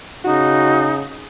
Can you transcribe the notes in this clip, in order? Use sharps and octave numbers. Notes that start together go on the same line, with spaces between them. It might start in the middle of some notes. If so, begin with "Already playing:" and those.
C#3 D#4 F#4